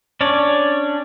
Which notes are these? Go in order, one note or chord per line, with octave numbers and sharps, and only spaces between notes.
C#4 D4 C#5 D5